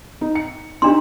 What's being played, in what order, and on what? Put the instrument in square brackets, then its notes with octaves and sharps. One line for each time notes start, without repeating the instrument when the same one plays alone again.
[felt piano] D#4
C#7
[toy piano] D4 C6 [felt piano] D#4 G4